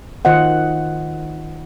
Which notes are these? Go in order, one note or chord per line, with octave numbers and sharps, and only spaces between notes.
D#3 F4 C5 D#5 F#5